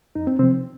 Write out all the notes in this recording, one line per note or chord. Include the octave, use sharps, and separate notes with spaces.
F2 D#4
C4
C3 F3 C4